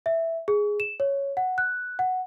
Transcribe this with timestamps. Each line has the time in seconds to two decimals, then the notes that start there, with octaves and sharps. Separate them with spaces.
0.06 E5
0.48 G#4
0.80 E7
1.00 C#5
1.37 F#5
1.58 F#6
1.99 F#5